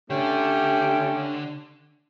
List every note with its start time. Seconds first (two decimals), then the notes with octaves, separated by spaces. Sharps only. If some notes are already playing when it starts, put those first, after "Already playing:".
0.10 D3 A3 C#4 G4